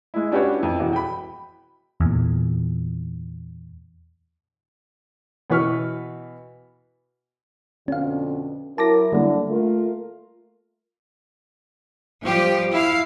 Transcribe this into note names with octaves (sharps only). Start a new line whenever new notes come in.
G#3 E4
C#4 D4 F#4 G4 B4 C#5
F2 E4
E1 E2 F#4
G5 B5
E2 A#2
B2 E3 B4 C#6 F6
F2 B2 D3 C#4 F5
F#3 E4 A#4 A5 D6 A#6
D3 G3 A#3
A3 F4 A#4
F3 G3 G4
E4 F5